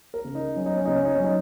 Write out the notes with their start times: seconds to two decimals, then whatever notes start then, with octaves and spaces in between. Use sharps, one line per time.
0.14 A#4
0.24 C#3
0.35 D#4
0.56 F#3 C#4
0.66 D#4
0.76 C#4
0.86 C#3 D#4
0.95 C#4
1.05 D#4
1.15 F#3 C#4
1.24 D#4